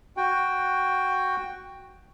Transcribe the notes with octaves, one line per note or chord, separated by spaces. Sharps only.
F#4 G5